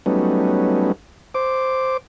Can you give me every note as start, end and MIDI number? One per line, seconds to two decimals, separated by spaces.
0.06 0.92 54
0.06 0.92 55
0.06 0.92 57
0.06 0.92 59
0.06 0.92 61
0.06 0.92 63
1.34 1.97 72
1.34 1.97 86